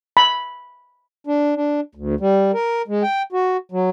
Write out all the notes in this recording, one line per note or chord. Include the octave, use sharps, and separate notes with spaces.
B5
D4
D4
D2
G3
A#4
G#3
G5
F#4
F#3